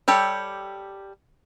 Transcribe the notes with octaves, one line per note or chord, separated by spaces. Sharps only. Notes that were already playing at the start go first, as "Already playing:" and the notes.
G3 G4 A4 C#5